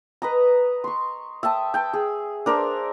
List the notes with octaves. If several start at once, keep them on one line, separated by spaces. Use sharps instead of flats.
B4 D#5 A#5
C6 C#6
E5 G5 A5 D#6
G5 A5
G#4
D4 A#4 C5 D5